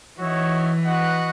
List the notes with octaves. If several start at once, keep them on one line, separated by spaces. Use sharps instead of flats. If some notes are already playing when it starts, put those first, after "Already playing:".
E3 D#4 F#4 C#5 E5
F#4 B4 D#5 F#5